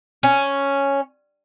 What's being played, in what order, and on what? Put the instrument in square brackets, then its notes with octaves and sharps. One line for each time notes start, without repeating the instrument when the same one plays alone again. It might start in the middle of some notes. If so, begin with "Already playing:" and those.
[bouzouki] C#4